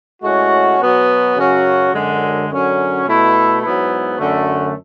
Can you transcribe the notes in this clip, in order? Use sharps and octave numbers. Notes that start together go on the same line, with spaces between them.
A2 G#3 C#4 F#4
B2 F#3 B3 F#4
F#2 C#3 F#3 C#4 F#4
F#2 D3 G#3
F#2 D3 F#3 C#4
B2 A3 E4
G#2 F#3 B3 E4
F#2 D3 A3